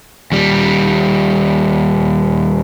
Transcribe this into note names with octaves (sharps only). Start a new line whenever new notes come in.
D#2 G3